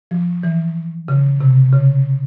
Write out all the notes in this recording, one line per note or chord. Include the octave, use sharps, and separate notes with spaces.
F3
E3
C#3
C3
C#3